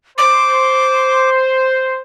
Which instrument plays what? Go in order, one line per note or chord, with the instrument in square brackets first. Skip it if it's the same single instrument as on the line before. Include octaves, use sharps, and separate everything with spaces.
[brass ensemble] C5 [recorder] D6